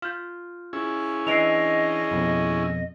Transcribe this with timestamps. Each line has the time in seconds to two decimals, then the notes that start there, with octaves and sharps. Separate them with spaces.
0.02 F4 F6 G6
0.73 C#4 E4 G#4
1.27 E3 D4 D#5 C7 D7 F7
2.11 F2 B2